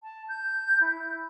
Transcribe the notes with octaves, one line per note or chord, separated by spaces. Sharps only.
A5
G6
E4